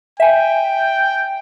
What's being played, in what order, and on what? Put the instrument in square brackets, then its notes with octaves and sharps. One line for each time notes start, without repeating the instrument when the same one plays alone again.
[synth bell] E5 G#5 [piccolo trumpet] G5